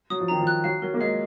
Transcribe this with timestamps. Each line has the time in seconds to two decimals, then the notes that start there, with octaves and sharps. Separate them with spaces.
0.10 F#3 D#6
0.20 F3
0.28 D#3 A#5
0.41 F3
0.47 F#6
0.64 F#3 F5
0.82 F#3 A#4
0.94 A#3
1.00 G#3 F5